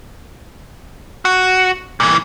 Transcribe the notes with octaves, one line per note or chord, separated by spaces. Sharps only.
F#4
A#2 E3